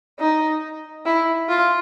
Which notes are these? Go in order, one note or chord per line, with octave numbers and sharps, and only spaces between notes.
D#4
E4
F4